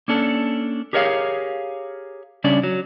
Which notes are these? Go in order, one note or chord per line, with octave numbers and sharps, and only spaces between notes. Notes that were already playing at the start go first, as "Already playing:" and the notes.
A#3 C#4 D4 A4
G4 G#4 A#4 C#5 D#5 F5
C#3 G3 C#4 D4 D5
F#3